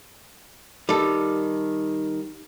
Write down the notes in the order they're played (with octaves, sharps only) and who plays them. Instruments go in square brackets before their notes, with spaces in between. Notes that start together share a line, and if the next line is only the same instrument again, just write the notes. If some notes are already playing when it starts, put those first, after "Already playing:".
[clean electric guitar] D#3 [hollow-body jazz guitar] G3 A4